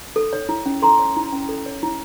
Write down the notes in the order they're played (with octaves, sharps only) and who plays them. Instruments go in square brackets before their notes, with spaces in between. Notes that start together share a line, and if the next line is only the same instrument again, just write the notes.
[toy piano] A4
C#5
E4
C#4
A4 A#5 C6
C#5
E4
C#4
A4
C#5
E4